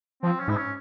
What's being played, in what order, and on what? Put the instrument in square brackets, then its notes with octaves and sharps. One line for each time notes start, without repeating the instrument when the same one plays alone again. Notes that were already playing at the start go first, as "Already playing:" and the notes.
[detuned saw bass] F3 [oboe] C4
[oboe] C#4
[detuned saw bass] G#2 [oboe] E4
[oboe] C#4